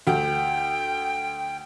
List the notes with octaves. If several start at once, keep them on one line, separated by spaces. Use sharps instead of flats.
D2 G5